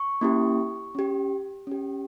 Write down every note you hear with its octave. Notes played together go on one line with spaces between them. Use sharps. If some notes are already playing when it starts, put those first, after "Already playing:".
Already playing: C#6
A#3 C#4 E4 G4
C#4 G4
C#4 G4